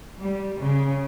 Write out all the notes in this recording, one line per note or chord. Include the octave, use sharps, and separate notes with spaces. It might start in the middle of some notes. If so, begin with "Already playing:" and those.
G3
C#3